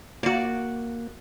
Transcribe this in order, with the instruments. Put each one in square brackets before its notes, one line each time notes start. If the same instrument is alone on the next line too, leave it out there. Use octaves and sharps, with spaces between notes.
[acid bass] A#3 [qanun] F#4 D5